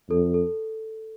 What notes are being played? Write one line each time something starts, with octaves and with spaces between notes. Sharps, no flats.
F2 A4
A4